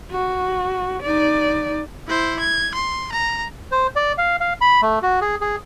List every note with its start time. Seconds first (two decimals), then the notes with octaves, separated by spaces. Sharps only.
0.11 F#4
1.03 D#4 D5
2.08 E4 C5
2.39 G#6
2.74 C6
3.12 A#5
3.72 C5
3.96 D5
4.18 F5
4.40 F5
4.61 B5
4.82 A3
5.02 F#4
5.21 G#4
5.41 G#4